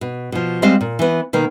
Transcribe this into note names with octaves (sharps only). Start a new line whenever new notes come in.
B2
B2 F3
G3 G#3 C4 C5 D#5 F5
A#2
E3 B3
B2 D#3 A#3